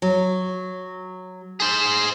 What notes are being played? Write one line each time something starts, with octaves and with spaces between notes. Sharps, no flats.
F#3
G#4 C5